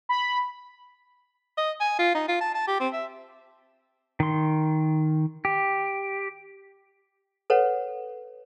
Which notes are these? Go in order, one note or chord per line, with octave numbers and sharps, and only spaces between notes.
B5
D#5
G#5
F4
D#4
F4
A5
A5
G4
C4
E5
D#3 C6
G4
A4 B4 C#5 F#5